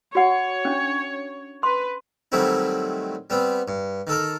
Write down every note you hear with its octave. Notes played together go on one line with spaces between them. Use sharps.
F#4 C#5 F#5
C#4 D4
B4 C6
D#3 F#3 G3 A3 C4 E4
G3 B3 C4
G2
D#3 A4 A#4